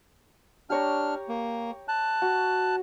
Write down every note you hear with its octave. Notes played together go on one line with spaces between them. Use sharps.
D4 G4 C#5 A#5 F6
A#3
A5 F#6
F#4